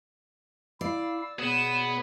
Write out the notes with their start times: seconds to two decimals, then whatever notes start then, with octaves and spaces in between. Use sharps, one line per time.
0.81 E4 D5 F5 E6
1.39 B2 B3 G#4 C#5 E7